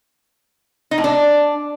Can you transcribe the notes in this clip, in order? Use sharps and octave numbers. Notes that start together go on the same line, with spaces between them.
D#4
A2
D4